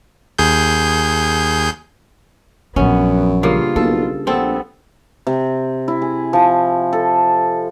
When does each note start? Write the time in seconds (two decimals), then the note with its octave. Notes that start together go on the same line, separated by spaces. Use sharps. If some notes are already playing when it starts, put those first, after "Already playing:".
0.38 D#2 G#4 G6
2.76 A#1 F#2 F3 B3 C#4
3.43 G2 C#3 A#3 F4
3.76 B1 A#3 A4
4.27 A#1 B3 C4 A4
5.27 C3
5.88 E4
6.02 G#4
6.33 F3
6.93 A4